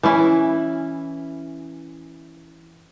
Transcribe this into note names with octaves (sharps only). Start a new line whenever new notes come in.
E3 C#4 E4